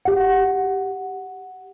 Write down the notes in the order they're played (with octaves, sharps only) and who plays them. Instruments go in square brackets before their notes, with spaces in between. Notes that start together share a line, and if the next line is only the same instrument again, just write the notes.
[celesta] G4 F#5